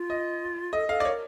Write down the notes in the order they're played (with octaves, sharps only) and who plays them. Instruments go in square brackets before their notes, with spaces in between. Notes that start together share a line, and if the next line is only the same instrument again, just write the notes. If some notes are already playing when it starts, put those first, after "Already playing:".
Already playing: [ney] F4
[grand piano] D#5
[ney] A4 [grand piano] D#5
[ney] A4 [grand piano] F5
[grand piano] D5
[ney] A#4 [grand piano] C#5